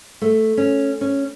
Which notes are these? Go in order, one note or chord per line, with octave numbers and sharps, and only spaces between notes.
A3
C#4
C#4